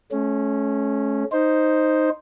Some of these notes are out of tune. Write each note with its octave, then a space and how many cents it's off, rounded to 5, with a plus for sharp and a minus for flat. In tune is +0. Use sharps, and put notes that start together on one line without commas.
A3 -40 C#4 -10
D#4 +0 C5 +0